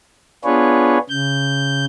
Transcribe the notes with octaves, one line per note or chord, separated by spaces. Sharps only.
B3 D4 F4 G#4 B4 C#5
C#3 G6